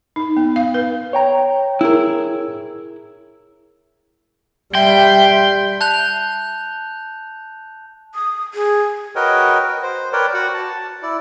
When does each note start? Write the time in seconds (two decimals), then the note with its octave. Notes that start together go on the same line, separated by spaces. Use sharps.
0.16 D#4
0.36 B3
0.56 F5
0.74 B4
1.13 C#5 G5 A#5
1.81 E4 G#4 A#4
4.75 G3 E5 G5 C6
5.81 A5 F#6 G6 F7
8.15 D#6
8.54 G#4
9.15 F#4 A#4 B4 C#5 D#5 G5
9.82 C5
10.13 A#4 B4 C#5 D5 G5
10.34 F#4 F#5
10.54 A5
11.02 E4 D5